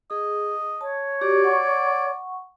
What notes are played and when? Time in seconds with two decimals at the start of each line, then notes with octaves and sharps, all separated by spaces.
0.11 G#4 D#5
0.81 C#5 A5
1.21 F#4 G4 D5
1.43 F#5 C#6